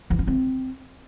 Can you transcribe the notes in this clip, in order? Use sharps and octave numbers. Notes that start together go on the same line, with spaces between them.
E3
C#4
C4